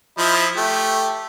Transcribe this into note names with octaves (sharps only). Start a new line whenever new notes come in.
F3 E4 D#5
A3 G4